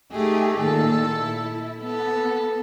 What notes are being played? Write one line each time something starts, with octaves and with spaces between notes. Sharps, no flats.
A3 D#4 G4 G#4
A#2 D#3 A4
E4
B3 A4